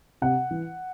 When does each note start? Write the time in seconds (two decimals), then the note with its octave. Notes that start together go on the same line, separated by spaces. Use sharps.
0.22 C3 F#5
0.51 E3